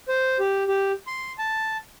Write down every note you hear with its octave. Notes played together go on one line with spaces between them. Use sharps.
C5
G4
G4
C6
A5